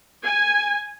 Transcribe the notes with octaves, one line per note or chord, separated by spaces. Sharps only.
G#5